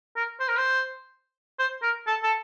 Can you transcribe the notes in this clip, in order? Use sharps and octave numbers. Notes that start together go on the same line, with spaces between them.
A#4
C5
A#4
C5
C5
A#4
A4
A4